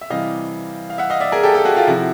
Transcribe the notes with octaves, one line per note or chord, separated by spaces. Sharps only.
E5
C3 E3 G3 D#5 F5
F5
E5 F#5
D#5 F5
D5 E5
G#4 A#4
G4 A4
G4 A4
F#4 G#4
F4 G4
C3 F3 E4 F#4